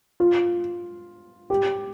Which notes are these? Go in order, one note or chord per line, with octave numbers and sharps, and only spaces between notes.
F4
G4